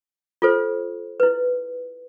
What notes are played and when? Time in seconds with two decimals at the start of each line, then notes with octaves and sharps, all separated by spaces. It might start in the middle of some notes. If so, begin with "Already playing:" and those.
0.42 F4 A4 C5
1.20 E4 B4